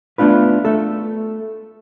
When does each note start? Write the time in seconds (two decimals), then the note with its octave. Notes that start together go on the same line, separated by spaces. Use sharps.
0.18 A3 B3 D4 F4 B4
0.65 A3 A4